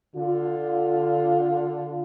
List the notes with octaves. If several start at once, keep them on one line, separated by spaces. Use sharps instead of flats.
D3 F4